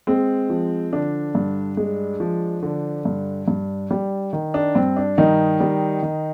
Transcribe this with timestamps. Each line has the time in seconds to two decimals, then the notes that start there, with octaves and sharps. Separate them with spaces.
0.07 G#3 C4
0.50 F3
0.92 D3 D4
1.35 G2
1.77 G#3
2.20 F3
2.63 D3
3.05 G2
3.48 G2
3.91 G3
4.33 D#3
4.54 D4
4.75 G2 C4
4.97 D4
5.18 G2 D#3 D#4
5.60 G3
6.02 D#3